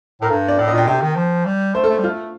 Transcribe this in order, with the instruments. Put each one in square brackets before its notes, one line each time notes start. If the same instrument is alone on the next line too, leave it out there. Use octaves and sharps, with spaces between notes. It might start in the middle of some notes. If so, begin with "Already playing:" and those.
[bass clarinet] A2 [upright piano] A#4
[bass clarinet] G2 [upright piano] A4
[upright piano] D5
[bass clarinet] A2 [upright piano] D5
[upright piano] D#5
[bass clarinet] A#2 [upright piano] G5
[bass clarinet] C3 [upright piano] G5
[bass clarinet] D#3
F3
G3
[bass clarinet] A3 [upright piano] C5
[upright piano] A4
[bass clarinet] A3
G3
[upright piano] F4
[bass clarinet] A3